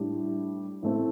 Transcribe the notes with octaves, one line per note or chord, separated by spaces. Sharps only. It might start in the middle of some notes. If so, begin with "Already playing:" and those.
Already playing: A2 G3 D4
A2 A3 C4